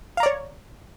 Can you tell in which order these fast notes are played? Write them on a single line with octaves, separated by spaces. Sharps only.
F5 A#5 D5 C#5